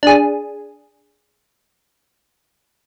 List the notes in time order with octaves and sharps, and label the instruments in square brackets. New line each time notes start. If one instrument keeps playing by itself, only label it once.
[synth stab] D4 G#4